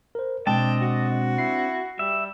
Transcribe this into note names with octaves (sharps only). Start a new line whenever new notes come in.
A#4 C5
B2 G#3 C4 D4 D#5 G5 A5
F#4
E4 C7
G3 E5